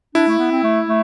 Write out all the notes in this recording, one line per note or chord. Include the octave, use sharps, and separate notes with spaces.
D4 E4
A3
B3
C4
A3
A3